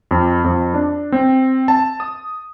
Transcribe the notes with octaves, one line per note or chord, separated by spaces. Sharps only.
F2
F2
D4
C4
A5
D#6